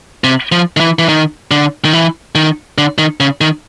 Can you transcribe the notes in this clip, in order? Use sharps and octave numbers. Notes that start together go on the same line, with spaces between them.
C3
F3
D#3
E3
E3
D#3
D3
D#3
E3
D#3
D3
D#3
C#3
D#3